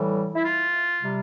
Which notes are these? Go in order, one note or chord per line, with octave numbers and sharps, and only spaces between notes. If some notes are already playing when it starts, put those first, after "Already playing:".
Already playing: A2 E3 G3
E4
F4
C3 G3